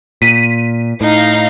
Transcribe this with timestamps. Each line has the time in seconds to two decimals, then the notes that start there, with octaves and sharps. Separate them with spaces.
0.22 A#2 B6 D#7
1.01 A2 D#4 F5